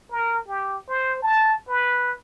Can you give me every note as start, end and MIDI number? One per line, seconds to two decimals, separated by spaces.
0.11 0.38 70
0.48 0.77 67
0.88 1.19 72
1.22 1.54 81
1.69 2.13 71